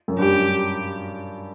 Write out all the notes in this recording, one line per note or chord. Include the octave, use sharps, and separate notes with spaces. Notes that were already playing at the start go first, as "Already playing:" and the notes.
F#2
G2 G4